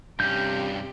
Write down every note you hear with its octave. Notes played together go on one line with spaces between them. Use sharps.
G2 C3 C#4 G4 G6